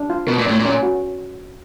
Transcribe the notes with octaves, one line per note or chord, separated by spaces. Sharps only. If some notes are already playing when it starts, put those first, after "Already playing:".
Already playing: D4
F4
B2 A#4
A#2
A2 D5
A#2
C#4
F#4